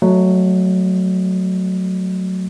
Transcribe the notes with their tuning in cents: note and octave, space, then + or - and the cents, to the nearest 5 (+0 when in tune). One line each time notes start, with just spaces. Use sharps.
F#3 +0 A3 +0 D#5 -30